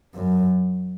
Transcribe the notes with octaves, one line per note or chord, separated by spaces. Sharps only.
F#2